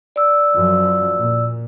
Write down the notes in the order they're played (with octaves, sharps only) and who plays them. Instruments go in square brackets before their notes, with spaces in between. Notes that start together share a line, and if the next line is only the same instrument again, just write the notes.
[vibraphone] D5 E6
[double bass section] F#2 F3
A#2